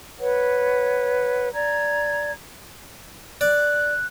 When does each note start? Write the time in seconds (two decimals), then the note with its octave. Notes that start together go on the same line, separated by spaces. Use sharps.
0.19 B4 C#5 F#5
1.54 D5 A#5 G#6
3.41 D5 F#6